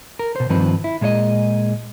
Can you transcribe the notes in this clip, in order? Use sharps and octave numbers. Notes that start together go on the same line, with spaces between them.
A#4
B2 C5
G2 D#3 F3 C4 B4
E4
A#2 G#3 G#4 C#5 D#5